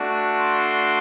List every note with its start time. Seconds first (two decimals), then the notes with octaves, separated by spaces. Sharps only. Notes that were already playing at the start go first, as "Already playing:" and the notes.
Already playing: A3 D4 F#4
0.37 C6